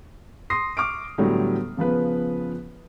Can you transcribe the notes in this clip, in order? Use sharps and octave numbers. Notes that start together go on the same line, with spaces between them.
C6 D#6 A#6 C7
C#6 D6 F6 D7
A2 D3 F#3 G3 B3 G4
C#3 F3 B3 B4